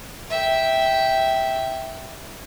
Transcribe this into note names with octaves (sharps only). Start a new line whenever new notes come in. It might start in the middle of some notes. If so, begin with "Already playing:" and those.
E5 G5